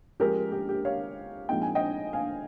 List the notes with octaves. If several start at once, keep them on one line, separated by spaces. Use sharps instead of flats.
F3 G#3 C#4 G4 A#4
G4
G4
C#5 F5
A#2 F3 G#3 C4 D#4 G5
G#5
D#5 G5
F5 G#5